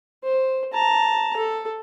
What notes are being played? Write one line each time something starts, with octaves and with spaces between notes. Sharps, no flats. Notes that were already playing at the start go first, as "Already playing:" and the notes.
C5
A5 A#5
A4